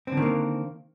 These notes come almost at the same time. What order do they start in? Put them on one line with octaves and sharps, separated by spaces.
C4 D3 D#3 A#3